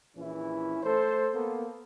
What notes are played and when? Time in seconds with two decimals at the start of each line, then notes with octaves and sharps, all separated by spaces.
0.16 A#1 E3 C#4 E4
0.82 A3 A4 C5
1.34 A#3 B3 A4